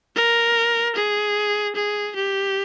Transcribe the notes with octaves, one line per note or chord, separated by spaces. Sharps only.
A#4
G#4
G#4
G4